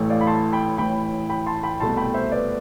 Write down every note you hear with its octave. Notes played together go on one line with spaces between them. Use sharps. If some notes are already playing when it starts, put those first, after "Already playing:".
Already playing: A1 A2 E3 A3
D5 F5
B5
A5 C6
G5 B5
A1 A2 E3 G5 B5
G5 B5
A5 C6
G5 B5
C2 B2 A3 A5 C6
G5 B5
C5 E5
B4 D5